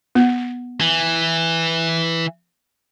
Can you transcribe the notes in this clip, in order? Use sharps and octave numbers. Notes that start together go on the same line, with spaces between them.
B3
E3